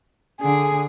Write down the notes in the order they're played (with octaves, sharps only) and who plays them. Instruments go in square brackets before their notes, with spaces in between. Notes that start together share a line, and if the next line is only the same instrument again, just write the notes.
[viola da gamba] D3 [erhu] G#4